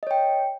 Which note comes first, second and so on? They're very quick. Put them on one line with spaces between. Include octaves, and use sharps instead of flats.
D#5 C#5 G5